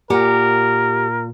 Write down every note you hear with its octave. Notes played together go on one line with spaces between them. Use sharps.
A#2 G4 A#4 F#5 G#5